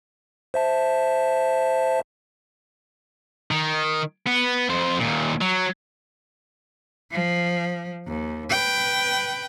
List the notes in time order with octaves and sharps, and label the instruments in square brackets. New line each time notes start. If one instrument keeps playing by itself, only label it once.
[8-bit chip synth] C5 E5 A5
[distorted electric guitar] D#3
B3
F2 C5
D#2 A#2
F#3
[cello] F3
D#2
B4 G5